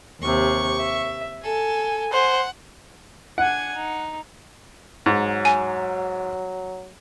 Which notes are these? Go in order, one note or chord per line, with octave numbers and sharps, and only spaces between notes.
D#2 C3 C#6
E5
A4 G#5
C5 F#5
D4 F#5 G#5
D#4
G#2 F#3
G#5